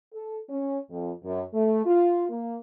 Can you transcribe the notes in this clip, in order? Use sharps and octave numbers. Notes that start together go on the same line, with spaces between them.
A4
C#4
F2
F#2
A3
F4
A#3